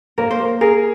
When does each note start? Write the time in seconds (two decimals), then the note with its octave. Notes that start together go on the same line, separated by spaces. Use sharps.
0.18 A#3 A#4
0.31 C5
0.39 A#3
0.45 A#4
0.61 G#4 A#4